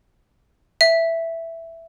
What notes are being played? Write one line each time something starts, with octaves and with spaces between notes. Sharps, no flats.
E5